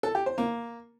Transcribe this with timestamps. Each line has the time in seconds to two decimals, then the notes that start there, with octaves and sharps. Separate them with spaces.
0.03 A4
0.15 G4
0.26 C5
0.38 A#3